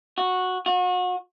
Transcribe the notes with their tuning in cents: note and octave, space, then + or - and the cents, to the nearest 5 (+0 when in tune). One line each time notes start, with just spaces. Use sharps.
F#4 -10
F#4 -35